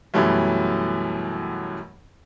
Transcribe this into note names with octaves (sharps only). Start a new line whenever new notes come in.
F#2 B2 E3 F#3 G3 A3